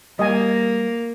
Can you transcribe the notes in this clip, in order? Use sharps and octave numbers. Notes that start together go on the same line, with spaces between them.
G3 A#3 D#5 G#5